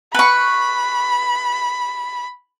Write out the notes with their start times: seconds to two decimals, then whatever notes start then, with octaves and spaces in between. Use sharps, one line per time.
0.15 B4 B5 C#6